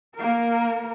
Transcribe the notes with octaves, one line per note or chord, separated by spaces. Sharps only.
A#3 A#4